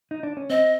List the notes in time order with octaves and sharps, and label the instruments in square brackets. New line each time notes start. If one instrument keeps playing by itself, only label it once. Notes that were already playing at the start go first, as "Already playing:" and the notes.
[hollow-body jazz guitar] D#4
D4
C#4
[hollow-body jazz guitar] C4 [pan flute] D#5